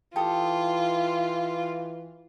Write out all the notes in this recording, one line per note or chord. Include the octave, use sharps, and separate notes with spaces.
E3 F4 G4 A4 D#6